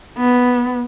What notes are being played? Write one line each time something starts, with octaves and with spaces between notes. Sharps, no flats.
B3